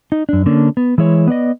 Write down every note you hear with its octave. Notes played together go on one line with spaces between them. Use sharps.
D#4
F#2 D4
D3 A#3 C#4 D4
B3
E3 G#3 E4 C#5
B3 B4 D5 D#5